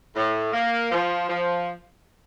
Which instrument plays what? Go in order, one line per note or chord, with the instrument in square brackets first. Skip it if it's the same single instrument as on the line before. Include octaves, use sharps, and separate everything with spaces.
[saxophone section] A2
A#3
F3
F3